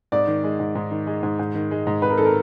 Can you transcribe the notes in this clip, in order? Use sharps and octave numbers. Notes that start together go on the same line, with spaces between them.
G#2 D5
D#3
G#3
G#2
G#2
D#3
G#3
G#2
G#2
D#3
G#3
G#2
G#2 B4
A#4
D#3 A4
A#4